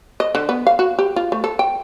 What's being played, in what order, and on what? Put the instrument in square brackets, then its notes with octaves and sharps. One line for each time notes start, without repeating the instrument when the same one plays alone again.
[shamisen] D#5
D3
B3
F5
F#4
G4
F4
A3
A4
G5